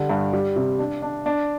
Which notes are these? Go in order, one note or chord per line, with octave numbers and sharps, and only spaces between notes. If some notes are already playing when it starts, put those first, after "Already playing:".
Already playing: D3 G3
G2
G3
C3
D4
D4
D4